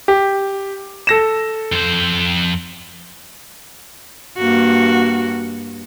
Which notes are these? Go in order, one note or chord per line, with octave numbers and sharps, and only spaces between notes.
G4
A4 A#6 E7
F2 C5
G2 A#3 F#4